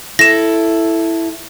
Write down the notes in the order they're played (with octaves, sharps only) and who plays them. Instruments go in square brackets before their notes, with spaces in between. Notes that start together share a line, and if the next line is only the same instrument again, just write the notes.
[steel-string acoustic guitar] E4 A4 [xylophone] A#6 E7